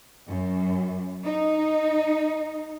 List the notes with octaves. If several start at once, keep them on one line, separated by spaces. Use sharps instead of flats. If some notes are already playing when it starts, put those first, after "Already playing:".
F#2
D#4